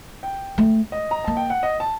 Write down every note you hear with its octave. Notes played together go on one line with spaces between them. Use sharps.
G5
A3
D#5
A#5
A#3 A5
G5
F#5
D#5
A5